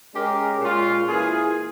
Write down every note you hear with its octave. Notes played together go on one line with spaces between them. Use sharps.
G#3 C#4 G4 A#4
A#2 G#3 C#4 F4
E3 A#3 F4 G#4